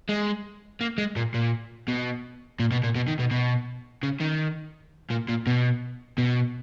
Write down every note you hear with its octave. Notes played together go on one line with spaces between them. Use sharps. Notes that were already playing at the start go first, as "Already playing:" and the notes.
G#3
A#3
G#3
A#2
A#2
B2
A#2
B2
A#2
B2
D#3
B2
B2
C#3
D#3
A#2
A#2
B2
B2